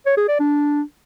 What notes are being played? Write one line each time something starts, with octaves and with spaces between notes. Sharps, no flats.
C#5
G#4
D5
D4